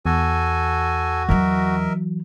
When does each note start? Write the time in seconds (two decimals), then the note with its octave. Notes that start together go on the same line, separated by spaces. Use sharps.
0.06 E2 F#4 A4 G#5
1.29 E3 F#3 A#4 D#5 E5